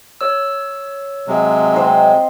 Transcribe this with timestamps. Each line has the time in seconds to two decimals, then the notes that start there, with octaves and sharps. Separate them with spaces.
0.21 C#5 E6
1.27 C3 F#3 G#3
1.74 C4 C5 D#5